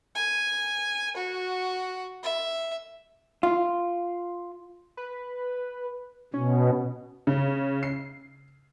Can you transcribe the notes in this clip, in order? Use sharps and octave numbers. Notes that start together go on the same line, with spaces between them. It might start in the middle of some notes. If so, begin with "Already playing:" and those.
G#5
F#4
E5
F4
B4
B2 C#4
C#3
C7